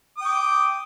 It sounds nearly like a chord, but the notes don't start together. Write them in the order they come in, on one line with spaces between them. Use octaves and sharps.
D#6 G5 D6